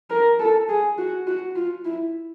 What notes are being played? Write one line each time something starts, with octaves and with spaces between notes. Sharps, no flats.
A#4
A4
G#4
F#4
F#4
F4
E4